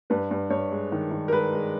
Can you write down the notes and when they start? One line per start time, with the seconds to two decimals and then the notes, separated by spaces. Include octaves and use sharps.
0.10 G2 B4
0.31 G2
0.50 G2 C#5
0.71 G#3
0.92 D#3
1.11 D#3
1.28 A#4
1.32 G#3 B4
1.53 G#3